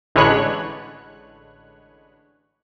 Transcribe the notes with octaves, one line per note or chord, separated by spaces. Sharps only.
A1 D3 G#3 B4 C#5 F#6